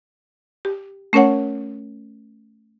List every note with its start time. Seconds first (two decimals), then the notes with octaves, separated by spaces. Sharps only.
0.65 G4
1.13 A3 C#4 A#4 C#5 F#5